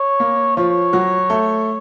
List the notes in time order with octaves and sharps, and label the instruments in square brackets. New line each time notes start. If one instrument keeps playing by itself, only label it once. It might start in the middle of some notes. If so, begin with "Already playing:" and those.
Already playing: [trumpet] C#5
[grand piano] A#3
[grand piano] F3 F4 [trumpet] C#5
[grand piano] F#3 F#4
A3 A4